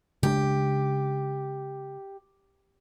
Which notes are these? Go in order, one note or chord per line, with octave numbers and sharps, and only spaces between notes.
C#3 G#3 D4 G4